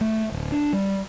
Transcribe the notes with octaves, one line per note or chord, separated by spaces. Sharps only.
A3
D1
D4
G3